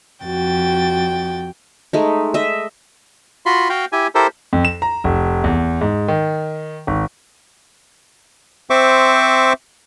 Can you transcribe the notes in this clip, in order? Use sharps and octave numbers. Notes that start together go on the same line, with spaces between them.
F2 F#4 G5 A6
G#3 A3 D#4
D#5 E5
F4 F#4 B5 C6
F#4 F5 G5
E4 G4 G#5
E4 G4 A4 A#4 C5
F2
E7
A#5
F1
E2
G#2
D#3
G#1
C4 C5 E5 C#6 D6